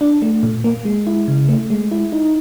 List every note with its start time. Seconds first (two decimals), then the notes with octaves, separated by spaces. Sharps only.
0.01 D4
0.22 A3
0.43 A#2
0.64 A#3
0.85 G#3
1.07 E4
1.28 C#3
1.49 A3
1.70 G#3
1.91 E4
2.12 D#4